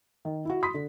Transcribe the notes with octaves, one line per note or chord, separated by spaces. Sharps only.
D#3
E4 F#4
B5 C6 D#6 B6
D3